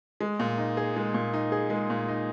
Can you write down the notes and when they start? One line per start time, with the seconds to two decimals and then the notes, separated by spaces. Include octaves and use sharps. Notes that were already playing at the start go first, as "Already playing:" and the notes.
0.21 G#3
0.39 A#2
0.58 D#4
0.77 G#4
0.96 G#3
1.14 A#2
1.34 D#4
1.52 G#4
1.70 G#3
1.90 A#2
2.08 D#4